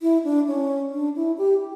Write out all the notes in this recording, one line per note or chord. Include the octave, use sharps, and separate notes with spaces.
E4
D4
C#4
D4
E4
G4